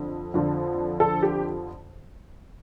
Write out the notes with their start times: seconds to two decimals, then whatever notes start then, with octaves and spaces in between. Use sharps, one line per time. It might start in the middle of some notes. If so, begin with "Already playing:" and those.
Already playing: F2 D3
0.34 F2 D3 F3
1.00 A4
1.23 G4